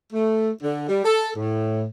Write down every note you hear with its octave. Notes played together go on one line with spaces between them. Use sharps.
A3
D3
G3
A4
A2